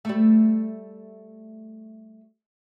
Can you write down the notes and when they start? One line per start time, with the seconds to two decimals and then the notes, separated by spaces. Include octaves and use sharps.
0.05 G3 A3